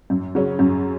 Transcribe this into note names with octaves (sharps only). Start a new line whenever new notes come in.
F#2
C#3 F#3 C#4
F#2